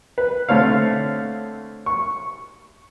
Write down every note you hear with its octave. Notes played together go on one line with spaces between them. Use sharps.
B4
D3 A3 C4 C#5 F5
C#6